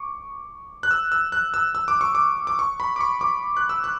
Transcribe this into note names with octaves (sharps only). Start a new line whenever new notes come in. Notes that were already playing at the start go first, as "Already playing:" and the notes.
Already playing: C#6 D6
F#6
E6
E6
F#6
E6
E6
D6
C#6
D6
D6
C#6
B5
D6
C#6
D6
F#6
E6
F#6